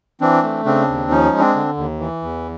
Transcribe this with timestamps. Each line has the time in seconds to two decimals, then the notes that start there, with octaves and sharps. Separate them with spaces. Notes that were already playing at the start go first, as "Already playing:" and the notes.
0.21 E3 C4 D4
0.43 A3
0.65 C#3 C4 D4
0.88 D#2
1.10 F3 C#4 D#4
1.32 G#3
1.39 C4 D4
1.56 D3
1.77 D#2
2.00 E3
2.22 E2